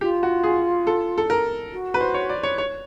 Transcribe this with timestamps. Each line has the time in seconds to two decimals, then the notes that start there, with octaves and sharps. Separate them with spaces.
0.01 F4 G4
0.23 F#4
0.44 G#4
0.87 A4
1.18 A4
1.30 A#4
1.73 F#4
1.94 B4
2.01 C5
2.14 C#5
2.29 D5
2.43 C#5
2.58 C#5